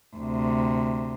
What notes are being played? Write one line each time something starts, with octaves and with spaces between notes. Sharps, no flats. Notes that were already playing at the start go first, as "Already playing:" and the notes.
D2 C3